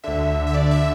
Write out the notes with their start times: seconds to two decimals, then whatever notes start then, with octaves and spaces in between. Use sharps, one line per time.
0.04 D2 D3 E5
0.47 E5
0.54 D5
0.71 E5